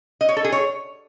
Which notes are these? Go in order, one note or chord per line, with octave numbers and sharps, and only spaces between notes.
D#5
C#5
A4
G#4
C#5